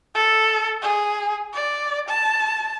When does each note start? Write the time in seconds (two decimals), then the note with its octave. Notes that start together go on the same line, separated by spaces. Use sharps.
0.15 A4
0.82 G#4
1.54 D5
2.08 A5